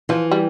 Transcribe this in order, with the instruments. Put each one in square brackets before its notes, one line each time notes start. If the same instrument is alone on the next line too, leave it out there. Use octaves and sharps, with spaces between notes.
[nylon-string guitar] E3 [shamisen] F3
[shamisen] G3